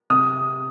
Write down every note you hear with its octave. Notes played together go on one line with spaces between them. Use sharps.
C3 D#6